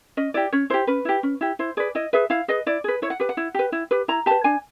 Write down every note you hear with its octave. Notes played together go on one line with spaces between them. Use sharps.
C#4 D#5
E4 G4 D5
C#4 C#5
E4 G4 C5
C#4 B4
E4 G4
C#4
E4 G4
E4 C5
G#4 B4 D5
E4 D#5
G#4 B4 E5
E4 F5
G#4 B4 D#5
E4 D5
G#4 B4
E4 C#5
F#5
G4 B4
F#5
E4
G4 B4
E4
G4 B4
E4 A#5
G4 B4 A5
D4 G#5